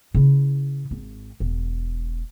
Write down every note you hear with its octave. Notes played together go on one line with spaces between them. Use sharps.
C#3 E4
G#1
E1